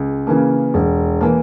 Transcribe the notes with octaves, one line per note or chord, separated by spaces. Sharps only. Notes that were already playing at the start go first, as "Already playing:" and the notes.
Already playing: C#2
C#3 E3 A#3
E1
E3 A#3